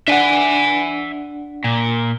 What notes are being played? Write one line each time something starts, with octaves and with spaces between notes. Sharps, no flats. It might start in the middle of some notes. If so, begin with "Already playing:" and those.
D4 E5 F#5 G#5
A#2